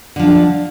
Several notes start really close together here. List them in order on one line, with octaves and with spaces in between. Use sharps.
D3 F3 D4